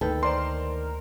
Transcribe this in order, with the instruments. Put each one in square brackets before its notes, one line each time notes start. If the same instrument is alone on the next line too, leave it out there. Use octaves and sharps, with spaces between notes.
[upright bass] D2 A#3 [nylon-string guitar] D#3 B4 G5 [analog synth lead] A4
[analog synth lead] A#4 [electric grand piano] C5 D5 C6